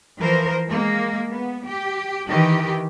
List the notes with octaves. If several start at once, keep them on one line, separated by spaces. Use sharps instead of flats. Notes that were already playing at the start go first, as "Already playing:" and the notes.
E3 F3 A#4 C5
G#3 A#3
B3
G4
D#3 E3 G4